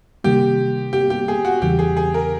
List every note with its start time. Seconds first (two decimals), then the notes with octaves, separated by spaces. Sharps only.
0.24 C3 D#3 G3 A#3 G4
0.93 G4
1.10 G4
1.28 G#4
1.45 F#4
1.62 E2 C#3 E3 G3 G4
1.79 G#4
1.97 G#4
2.14 A#4